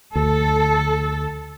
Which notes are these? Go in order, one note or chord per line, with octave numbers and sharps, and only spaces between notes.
D2 A4